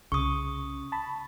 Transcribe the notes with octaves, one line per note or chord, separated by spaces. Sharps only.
C2 C#3 C#6 D#6
A5 B5